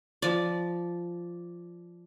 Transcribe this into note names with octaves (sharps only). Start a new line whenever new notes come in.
F3 D5